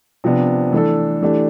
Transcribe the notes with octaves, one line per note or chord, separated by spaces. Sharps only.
C3 F3 B3 D4
E3 A3 D4 A4
E3 A3 D4 G4